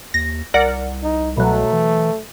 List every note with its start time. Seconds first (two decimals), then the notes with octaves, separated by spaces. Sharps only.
0.14 D#2 A#6
0.54 C2 A#4 D5 F#5
1.03 D#4
1.37 B2 F#3 A3
1.73 E3